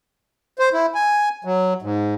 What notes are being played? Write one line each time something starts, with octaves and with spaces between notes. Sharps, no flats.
C5
E4
G#5
F#3
G#2